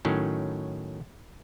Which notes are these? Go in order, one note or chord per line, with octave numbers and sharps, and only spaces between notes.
A2 D#3 F#3 C#4